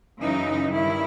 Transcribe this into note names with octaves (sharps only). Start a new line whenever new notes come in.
F#2 C#3 E3 D#4
G2 D#3 E4